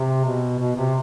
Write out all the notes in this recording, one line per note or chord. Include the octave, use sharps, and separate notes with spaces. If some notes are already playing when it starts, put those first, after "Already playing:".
Already playing: C3
B2
B2
C3